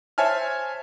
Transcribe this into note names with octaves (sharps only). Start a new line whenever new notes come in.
C5 C#5 E5 G#5 A5 F6